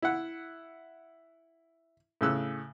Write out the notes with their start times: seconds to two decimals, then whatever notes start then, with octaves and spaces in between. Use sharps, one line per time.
0.02 E4 F#5
2.21 A2 C#3 E6 F#6